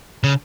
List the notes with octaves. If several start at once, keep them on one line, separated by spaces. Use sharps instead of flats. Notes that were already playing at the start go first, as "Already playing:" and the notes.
C#3